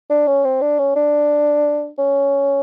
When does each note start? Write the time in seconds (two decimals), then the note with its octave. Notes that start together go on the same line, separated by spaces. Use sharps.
0.10 D4
0.27 C#4
0.45 C4
0.61 D4
0.79 C#4
0.96 D4
1.98 C#4